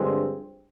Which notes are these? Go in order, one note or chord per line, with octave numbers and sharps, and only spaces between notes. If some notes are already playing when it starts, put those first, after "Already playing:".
Already playing: G2 D3 F3 G#3 C4